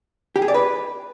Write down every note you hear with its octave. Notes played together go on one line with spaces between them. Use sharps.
G4
G#4
D5
B4